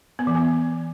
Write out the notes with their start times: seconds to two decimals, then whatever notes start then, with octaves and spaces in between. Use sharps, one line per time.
0.19 B3
0.27 E3
0.35 B3